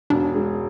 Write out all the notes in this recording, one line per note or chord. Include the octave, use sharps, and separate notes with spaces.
E1 D4
G#3